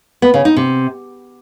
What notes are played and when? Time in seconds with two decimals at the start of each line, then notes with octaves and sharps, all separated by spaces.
0.22 B3
0.34 C#3
0.45 D#4
0.56 C3